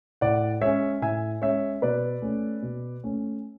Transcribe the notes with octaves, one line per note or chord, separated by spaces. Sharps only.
A2 D5 F#5
G#3 C#4 C#5 E5
A2 E5 G#5
G#3 C#4 C#5 E5
B2 B4 D5
A3 C#4
B2
A3 C#4